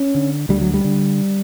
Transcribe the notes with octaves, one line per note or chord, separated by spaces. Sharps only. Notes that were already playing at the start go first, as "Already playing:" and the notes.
Already playing: C#4
D3
D2 G3
F#3
G3
D3